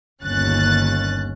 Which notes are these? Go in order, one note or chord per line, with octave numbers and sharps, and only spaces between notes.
G1 D#2 C#4 F#6 A6